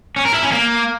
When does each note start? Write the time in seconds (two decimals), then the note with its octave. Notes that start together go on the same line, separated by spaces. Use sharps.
0.16 C#4
0.25 A#4
0.34 E4
0.43 C#4
0.52 A#3